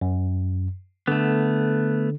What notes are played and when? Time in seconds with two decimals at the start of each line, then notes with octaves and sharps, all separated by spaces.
0.01 F#2
1.07 D3 A3 B3